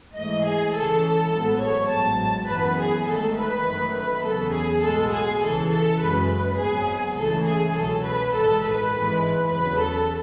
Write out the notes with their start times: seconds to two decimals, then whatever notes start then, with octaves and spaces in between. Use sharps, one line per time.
0.14 G#2 E3 A3 D#5
0.43 G#4
0.73 C#2 C#3 E3 A4
1.32 A1 G#2 F#3 B3
1.61 C#5
1.90 A1 G#2 F#3 A5
2.48 F#2 E3 B3 B4
2.78 G#4
3.07 G#1 G#2 D#3 A3 A4
3.36 B4
3.65 F#2 D#3 A3
3.94 B4
4.23 E2 C#3 F#3 B3 A4
4.53 G#4
4.82 B1 A2 G#3 B3 A4
5.11 G#4
5.41 C#2 C#3 E3 A4
5.70 A4
5.99 F#2 C#3 G#3 B4
6.28 B4
6.57 G#1 G#2 F#3 B3 G#4
7.15 C#2 C#3 E3 A3 A4
7.45 G#4
7.74 C#2 B2 F#3 A4
8.03 B4
8.32 A1 G#2 D#3 A4
8.62 B4
8.91 G#1 G#2 E3 G#3
9.49 E2 C#3 F#3 B4
9.79 A4